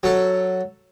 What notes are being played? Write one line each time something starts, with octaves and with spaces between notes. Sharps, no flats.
F#3 A4